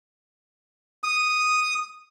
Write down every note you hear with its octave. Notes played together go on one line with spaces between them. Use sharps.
D#6